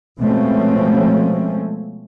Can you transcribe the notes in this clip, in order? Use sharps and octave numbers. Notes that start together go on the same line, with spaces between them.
B2 F3 G#3 A3 C4 C#4